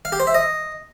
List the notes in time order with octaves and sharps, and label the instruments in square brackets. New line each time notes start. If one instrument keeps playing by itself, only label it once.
[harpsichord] F5
G4
C5
E5
D#5